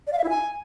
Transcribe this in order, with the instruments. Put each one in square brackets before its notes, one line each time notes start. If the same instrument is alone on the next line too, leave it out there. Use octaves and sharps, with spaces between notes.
[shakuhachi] D5
F5
E5
E4
G#5